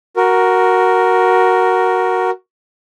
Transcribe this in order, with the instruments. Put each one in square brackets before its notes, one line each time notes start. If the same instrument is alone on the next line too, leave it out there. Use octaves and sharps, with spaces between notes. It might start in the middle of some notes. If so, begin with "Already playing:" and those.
[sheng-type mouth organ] F#4 A#4